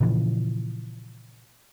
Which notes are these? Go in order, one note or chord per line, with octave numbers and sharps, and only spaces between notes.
A#2 C#3 E3 F3